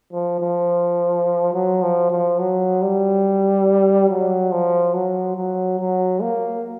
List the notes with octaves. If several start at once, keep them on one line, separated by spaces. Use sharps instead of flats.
F3
F3
F#3
F3
F3
F#3
G3
F#3
F3
F#3
F#3
F#3
A#3